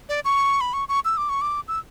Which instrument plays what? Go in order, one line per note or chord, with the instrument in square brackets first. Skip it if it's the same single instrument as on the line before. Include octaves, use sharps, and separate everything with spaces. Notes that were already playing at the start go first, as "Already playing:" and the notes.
[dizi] D5
C#6
B5
C#6
C#6
E6
D6
C#6
D6
E6